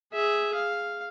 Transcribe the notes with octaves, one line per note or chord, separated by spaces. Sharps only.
G#4 E5
F5